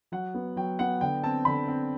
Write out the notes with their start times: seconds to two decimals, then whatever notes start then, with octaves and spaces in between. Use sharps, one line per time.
0.12 F#3 F#5
0.34 B3
0.56 F#3 G5
0.79 B3 F#5
1.01 D3 G5
1.23 C4 A5
1.45 D3 B5
1.68 C4